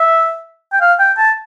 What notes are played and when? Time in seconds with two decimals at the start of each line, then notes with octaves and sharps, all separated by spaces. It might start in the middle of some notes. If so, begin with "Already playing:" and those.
Already playing: E5
0.73 G5
0.81 F5
0.99 G5
1.18 A5